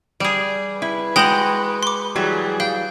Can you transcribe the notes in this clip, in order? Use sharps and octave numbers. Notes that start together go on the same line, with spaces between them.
G3 G#4 D5
E4 B4
G#3 F#4 D#5 G5 G6 F#7
C6 D6
E3 F#3 G3 G#4
F5 G5